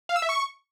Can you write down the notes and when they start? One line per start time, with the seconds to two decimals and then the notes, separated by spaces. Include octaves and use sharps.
0.09 F5
0.16 E6
0.22 E5
0.29 C#6